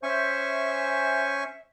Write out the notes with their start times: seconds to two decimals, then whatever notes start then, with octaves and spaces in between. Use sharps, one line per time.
0.03 C#4 C5 E5 G#5 C#6